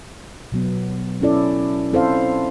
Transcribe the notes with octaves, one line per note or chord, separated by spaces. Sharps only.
B2 F#3 B3
C#4 E4 A4 D5
C4 E4 A4 C5 F5